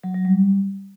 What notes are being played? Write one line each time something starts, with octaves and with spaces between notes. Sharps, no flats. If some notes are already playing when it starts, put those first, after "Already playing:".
F#3
F#3
G3